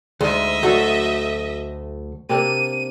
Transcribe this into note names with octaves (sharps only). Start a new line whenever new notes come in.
D2 G#2 D#5 E5
D2 F#3 A3
C3 A#3 D4 D#7